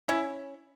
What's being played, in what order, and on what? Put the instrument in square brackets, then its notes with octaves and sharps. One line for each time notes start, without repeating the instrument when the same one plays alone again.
[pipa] C#4 [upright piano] E4